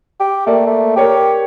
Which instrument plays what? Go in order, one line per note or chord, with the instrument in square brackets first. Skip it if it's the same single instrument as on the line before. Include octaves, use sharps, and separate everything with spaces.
[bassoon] G4
[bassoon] A3 [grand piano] A#3 D5
[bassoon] A3
[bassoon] G4 [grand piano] A#4 C#5 D5